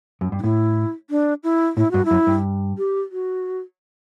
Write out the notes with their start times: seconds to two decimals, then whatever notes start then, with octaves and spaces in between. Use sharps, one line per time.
0.21 F#2
0.32 G2
0.39 D4
0.43 A2 E4
1.10 D4
1.43 E4
1.77 A2 E4
1.91 G2 F#4
2.05 E4
2.11 F#2
2.27 G2
2.78 G4
3.12 F#4